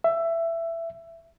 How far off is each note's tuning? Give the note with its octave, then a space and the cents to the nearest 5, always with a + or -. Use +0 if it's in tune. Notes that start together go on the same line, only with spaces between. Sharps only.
E5 +15